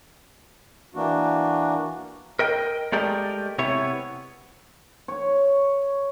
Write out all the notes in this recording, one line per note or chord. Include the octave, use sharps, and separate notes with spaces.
E3 A#3 D4 F#4
A#4 D#5 G5
G#3 A3 G4 A#4 D5 D#5
C3 B3 E4 C#5
C#5